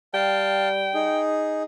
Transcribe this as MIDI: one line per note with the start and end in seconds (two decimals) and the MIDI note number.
0.14 1.10 55
0.14 0.68 77
0.14 1.20 79
0.14 0.68 81
0.94 1.63 63
0.94 1.63 68